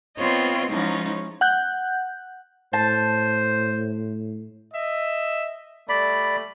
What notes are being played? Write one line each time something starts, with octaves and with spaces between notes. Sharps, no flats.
B3 C4 F4 C5 C#5 D#5
G#2 F3 G#3 C#4 D#4 E4
F#5 F#6 G6
A2 C5 A5
D#5 E5
G3 A3 D5 B5